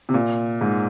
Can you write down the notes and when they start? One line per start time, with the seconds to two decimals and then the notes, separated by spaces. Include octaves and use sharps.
0.09 C3
0.14 A#2
0.61 G#2